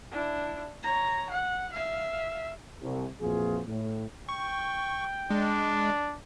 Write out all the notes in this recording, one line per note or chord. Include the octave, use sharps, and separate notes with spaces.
D4 E4
C#5 A#5
F#5
E5 F5
C2
F2 A#2 E3 F4 F#4 G#4
A2
G5 C#6
G#3 D4